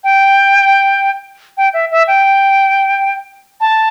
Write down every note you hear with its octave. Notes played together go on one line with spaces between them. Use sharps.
G5
G5
E5
E5
G5
A5